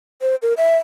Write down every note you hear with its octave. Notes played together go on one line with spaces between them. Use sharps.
C5
A#4
E5